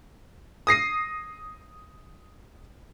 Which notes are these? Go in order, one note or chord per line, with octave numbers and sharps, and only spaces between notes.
D#6 A#6 C7 D#7